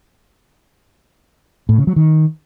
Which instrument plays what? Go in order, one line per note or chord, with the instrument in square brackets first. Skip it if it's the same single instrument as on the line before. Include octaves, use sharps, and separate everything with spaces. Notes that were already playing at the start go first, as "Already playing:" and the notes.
[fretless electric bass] A2
C#3
F#3
D#3